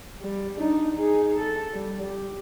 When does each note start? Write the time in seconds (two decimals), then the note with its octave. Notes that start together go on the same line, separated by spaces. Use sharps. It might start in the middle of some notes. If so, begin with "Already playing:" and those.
0.22 G3
0.57 D4 D#4
0.95 D#4 G#4
1.39 A4
1.73 G3
2.05 G4